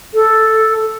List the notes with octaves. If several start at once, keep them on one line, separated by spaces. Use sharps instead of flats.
A4